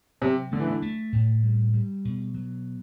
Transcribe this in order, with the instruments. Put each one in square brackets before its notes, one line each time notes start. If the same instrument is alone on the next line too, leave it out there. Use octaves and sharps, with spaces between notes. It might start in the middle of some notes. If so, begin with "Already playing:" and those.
[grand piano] C3 [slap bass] F#3
[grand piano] D3 [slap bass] A3
[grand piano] E3
D3
[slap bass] A3
A2
G3
G3
B2
F#3